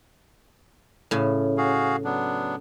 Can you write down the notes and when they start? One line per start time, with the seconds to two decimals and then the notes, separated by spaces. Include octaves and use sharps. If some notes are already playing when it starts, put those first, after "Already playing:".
1.11 A2 C#3
1.58 F#4 G#4 F5
2.05 F#3 B3 D4